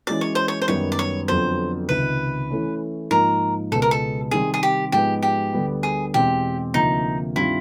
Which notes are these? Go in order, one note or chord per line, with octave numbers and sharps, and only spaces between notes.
E3 G#3 C#4 F#4 D5
C#5
C5
C#5
C5
F#2 D#3 G3 B3 C#5
D5
C#5
F2 D3 F#3 B3 C5
C#2 C3 D#3 B4
E3 A3 C#4
G#2 F3 A#3 D#4 A#4
C#2 B2 G#3 B3 A4
A#4
A4
C3 D#3 G3 C4 G#4
G#4
G4
G#2 F3 G#3 B3 G4
G4
D2 D3 G3 B3
G#4
E2 B2 G#3 C4 G4
D2 C3 F3 A#3 D#4
G2 D#3 G3 C4 E4 F4